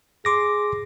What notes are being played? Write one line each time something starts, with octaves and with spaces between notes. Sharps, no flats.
G#4 C6 D6 A#6